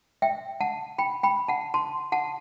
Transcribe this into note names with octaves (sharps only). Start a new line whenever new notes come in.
E5 G5
F#5 A5
G5 B5
G5 B5
F#5 A5
A5 C6
F#5 A5